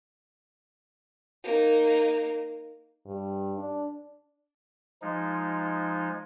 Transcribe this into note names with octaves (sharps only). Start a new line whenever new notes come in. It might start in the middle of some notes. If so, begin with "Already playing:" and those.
A#3 D#4
G2
D4
F3 G#3 D#4